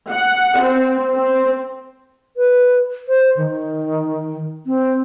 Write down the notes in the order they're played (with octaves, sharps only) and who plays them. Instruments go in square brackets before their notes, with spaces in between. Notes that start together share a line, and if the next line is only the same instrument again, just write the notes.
[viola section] F#5
C4
C4
[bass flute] B4
C5
D#3
C4